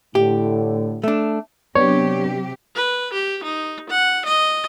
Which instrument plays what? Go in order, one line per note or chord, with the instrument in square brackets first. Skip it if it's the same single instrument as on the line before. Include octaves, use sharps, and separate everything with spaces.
[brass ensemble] A2 D3 [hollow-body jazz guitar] G4
[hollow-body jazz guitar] A3 D4
[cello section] C3 F#3 G4 [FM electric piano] B3 D4 [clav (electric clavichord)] C#5
[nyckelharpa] B4
G4
D#4
F#5
D#5